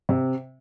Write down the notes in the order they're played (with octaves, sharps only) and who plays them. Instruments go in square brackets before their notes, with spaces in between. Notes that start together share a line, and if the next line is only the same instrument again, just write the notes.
[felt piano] C3